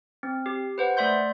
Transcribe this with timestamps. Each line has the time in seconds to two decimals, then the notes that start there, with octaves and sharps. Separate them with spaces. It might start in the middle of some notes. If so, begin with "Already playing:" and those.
0.23 C4
0.46 G4
0.78 B4 C5 F#5
0.97 A3 D5 E5 C6 G6